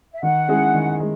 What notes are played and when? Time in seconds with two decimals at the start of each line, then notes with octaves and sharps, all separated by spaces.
0.12 E5
0.22 D#3 F#5
0.48 G#3 C#4 E4 G#4
0.74 D#3
1.00 G#3